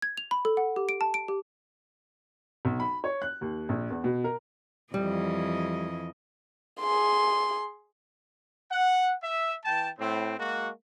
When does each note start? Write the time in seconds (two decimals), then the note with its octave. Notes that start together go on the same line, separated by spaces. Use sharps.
0.02 G#6
0.17 F7
0.31 B5
0.45 A4
0.57 F#5
0.76 G4
0.89 D7
1.01 A5
1.14 D7
1.28 G4
2.65 B1
2.80 B5
3.04 C#5
3.22 F#6
3.41 D#2
3.69 A#1
3.90 E2
4.04 B2
4.24 A#4
4.94 F2 E3 G3 D#5
6.80 G#4 C6
8.71 F#5
9.23 E5
9.65 E3 G5 A5
9.99 A2 C4
10.38 G#3 A#3 F#4